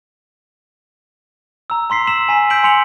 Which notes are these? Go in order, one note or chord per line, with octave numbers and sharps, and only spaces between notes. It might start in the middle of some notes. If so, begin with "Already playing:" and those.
A#5 E6
A#5 C6 B6 C7
A#5 C6 E6 B6 E7 F#7
G#5 A#5 B6
E6 G6 B6 D7 F#7
G#5 C6 C#7 F7 F#7